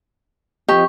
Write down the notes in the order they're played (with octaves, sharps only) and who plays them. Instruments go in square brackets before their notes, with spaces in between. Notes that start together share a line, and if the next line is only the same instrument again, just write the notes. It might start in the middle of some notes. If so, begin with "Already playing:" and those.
[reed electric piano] F3 C4 D#5 [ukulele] G4 [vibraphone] C#6